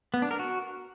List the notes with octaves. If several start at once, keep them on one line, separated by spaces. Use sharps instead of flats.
B3
D4
A#4
F#4